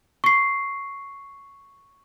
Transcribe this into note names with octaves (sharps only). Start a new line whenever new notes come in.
C#6 C7